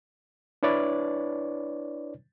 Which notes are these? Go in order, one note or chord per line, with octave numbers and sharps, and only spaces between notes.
D4 E4 B4 C#5 D5